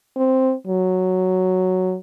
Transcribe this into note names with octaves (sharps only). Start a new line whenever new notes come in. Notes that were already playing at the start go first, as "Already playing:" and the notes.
C4
F#3